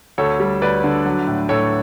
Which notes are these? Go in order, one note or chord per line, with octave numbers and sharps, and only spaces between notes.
D2 A4 C#5
G3
D2 B4 D5
D3
F#3
A2
A2 A4 C#5